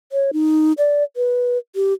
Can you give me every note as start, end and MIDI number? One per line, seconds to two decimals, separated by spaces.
0.12 0.31 73
0.33 0.73 63
0.78 1.03 74
1.16 1.58 71
1.75 1.93 67